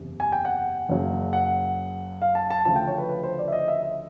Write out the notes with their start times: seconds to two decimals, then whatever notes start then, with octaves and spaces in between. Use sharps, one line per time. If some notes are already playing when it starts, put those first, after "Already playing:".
Already playing: F#1 E2 C3
0.20 G#5
0.32 G5
0.45 F#5
0.89 F#1 F#2 C#3 F#3
1.33 F#5
2.22 F5
2.35 A5
2.50 A5
2.65 D2 C#3 F3 A5
2.76 G5
2.87 C#5
2.98 B4
3.09 B4
3.23 C5
3.39 D5
3.48 E5
3.53 D#5
3.68 E5
3.83 E5